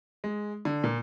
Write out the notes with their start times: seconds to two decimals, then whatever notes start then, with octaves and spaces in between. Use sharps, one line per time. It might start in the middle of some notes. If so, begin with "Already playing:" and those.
0.24 G#3
0.65 D3
0.84 A#2